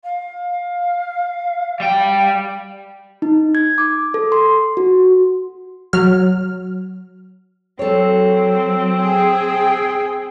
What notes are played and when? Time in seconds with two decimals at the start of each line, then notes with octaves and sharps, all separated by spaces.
0.04 F5
1.80 G3 G5
3.22 D#4
3.55 G#6
3.78 D6
4.14 A4
4.32 C6
4.77 F#4
5.93 F#3 F6
7.79 F#3 C4 A4 C#5
9.04 G#4 G5